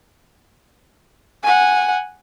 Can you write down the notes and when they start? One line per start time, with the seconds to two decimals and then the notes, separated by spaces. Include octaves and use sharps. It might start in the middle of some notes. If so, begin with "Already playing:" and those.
1.43 F#5 G#5